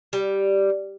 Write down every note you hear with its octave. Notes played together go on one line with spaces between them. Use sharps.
G3